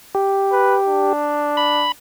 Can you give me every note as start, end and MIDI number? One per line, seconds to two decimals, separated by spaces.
0.15 1.13 67
0.52 0.77 71
0.88 1.88 62
1.57 1.92 83